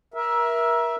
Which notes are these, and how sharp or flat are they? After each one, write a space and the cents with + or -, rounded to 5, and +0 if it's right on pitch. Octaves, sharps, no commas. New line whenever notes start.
A#4 +30 E5 +0